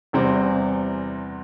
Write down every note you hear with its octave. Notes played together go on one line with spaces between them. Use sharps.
E2 C3 E3 G3 C4